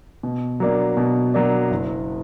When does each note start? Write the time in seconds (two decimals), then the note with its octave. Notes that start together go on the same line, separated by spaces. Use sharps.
0.23 B2
0.60 F#3 A#3 D4
0.97 B2
1.34 F#3 A#3 D4
1.71 F#1